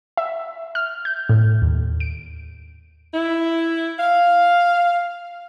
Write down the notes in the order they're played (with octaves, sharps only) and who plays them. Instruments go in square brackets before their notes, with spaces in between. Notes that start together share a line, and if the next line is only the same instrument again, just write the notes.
[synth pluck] E5
F6
G6
A2
D#2
D7
[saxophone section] E4
F5